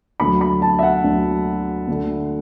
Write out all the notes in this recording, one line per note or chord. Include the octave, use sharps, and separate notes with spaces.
D2 D3 F#3 B5
B5
A5
E5
F#5
D2 D3 F#3
D2 D3 A3